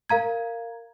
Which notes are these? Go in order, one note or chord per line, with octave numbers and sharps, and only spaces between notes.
A#4 F5 A#5 G#6